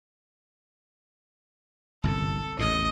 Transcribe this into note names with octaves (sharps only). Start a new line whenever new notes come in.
G1 C2 F#2 A4
A1 E2 A2 D#5